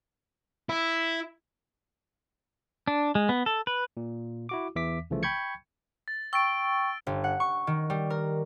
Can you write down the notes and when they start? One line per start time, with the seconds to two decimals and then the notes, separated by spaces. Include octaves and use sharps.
0.69 E4
2.88 D4
3.15 G#3
3.29 B3
3.46 A4
3.67 B4
3.97 A#2
4.49 E4 F#4 D6
4.76 E2 E3 E5 D6 B6
5.10 C2 C#3 E3 F3 A3
5.23 G5 B5 C#6 G6 G#6 C#7
6.08 A6
6.33 G5 C#6 E6 A6 D7
7.07 G1
7.24 F#5
7.40 C#6
7.67 D#3
7.90 G3
8.10 A#4